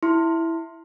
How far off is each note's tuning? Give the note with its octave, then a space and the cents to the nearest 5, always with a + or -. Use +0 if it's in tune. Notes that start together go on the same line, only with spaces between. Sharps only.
E4 +0 C6 +0